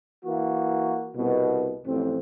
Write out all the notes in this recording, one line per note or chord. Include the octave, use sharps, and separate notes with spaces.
E3 A#3 F#4
C2 B2
A1 F2 C4